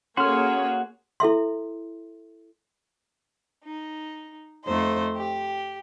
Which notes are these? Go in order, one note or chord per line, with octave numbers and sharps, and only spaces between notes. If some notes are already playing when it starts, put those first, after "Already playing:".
A#3 C#4 F#4 G#4 A4 C#5 C6 F6
E4 A4 E5 C6
D#4
F2 A3 D#4 C5
G4